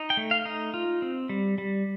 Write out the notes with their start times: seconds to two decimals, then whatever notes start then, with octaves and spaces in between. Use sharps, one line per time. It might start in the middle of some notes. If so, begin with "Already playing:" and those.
Already playing: D#4
0.10 G5
0.17 A3
0.31 F5
0.45 D#4
0.74 F4
1.02 C4
1.29 G3
1.58 G3